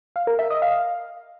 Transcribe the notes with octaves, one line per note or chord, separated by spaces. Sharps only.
F5
A#4
E5
D#5
F5